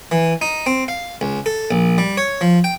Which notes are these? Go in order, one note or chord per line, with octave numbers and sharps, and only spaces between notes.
E3
D#4
C4
F5
C#2
A4
A#1
G3
C#5
F3
G5